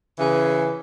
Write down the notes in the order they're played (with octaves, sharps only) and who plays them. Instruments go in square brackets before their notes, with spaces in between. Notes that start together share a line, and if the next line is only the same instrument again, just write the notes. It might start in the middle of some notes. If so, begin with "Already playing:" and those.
[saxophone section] C#3 E3 G#4